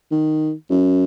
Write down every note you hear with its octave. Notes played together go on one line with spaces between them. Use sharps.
D#3
F#2